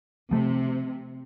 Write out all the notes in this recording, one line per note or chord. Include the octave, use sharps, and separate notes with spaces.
C3 F3 A3